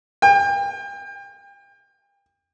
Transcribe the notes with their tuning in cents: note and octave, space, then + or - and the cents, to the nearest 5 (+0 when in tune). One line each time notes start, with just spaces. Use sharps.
G5 +35